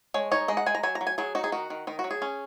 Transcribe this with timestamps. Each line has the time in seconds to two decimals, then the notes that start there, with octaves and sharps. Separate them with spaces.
0.14 G#3 C#5
0.31 D#4 C#5
0.48 G#3 D#5
0.57 F#5
0.66 G#3 G#5
0.75 A#5
0.83 F#3 G#5
0.95 A#5
1.01 F#3
1.07 G#5
1.18 F#3 G#4
1.35 D#4 F#4
1.44 G#4
1.52 D#3 F#4
1.70 D#3
1.87 D#3 D#4
1.99 F#4
2.04 F#3
2.11 G#4
2.22 C#4